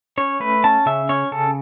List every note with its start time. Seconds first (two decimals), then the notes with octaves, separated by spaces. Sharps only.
0.17 C#4 C#5
0.40 A3 B4
0.64 C#4 A5
0.86 C#3 E5
1.09 C#4 C#5
1.32 C#3 A4